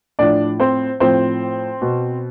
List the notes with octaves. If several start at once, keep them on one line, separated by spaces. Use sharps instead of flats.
A2 F3 D4 D5
C4 C5
A2 F3 C4 C5
B2